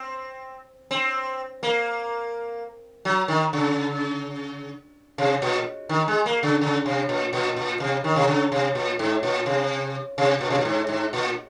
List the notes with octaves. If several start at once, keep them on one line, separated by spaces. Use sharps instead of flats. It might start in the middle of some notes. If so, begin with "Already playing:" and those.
Already playing: C4
C4
A#3
F#3
D#3
C#3
C3
A#2
D#3
G#3
A#3
C#3
C#3
C3
A#2
A#2
A#2
C3
D#3
C3
C#3
C3
A#2
G#2
A#2
C3
C3
A#2
C3
A#2
G#2
G#2
A#2